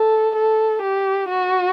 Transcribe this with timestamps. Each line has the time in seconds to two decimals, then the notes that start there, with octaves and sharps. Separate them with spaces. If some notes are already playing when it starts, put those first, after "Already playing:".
Already playing: A4
0.36 A4
0.82 G4
1.29 F#4